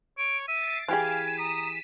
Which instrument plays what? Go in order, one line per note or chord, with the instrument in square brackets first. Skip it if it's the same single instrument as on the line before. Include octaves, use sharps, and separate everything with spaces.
[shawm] C#5 [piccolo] D7
[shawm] E5 [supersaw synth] A6 C7 D7 [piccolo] D#7
[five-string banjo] E3 G4 G#4 [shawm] F5 [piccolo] G#6 [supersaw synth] B6 D#7 E7
[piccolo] A#5 [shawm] D#6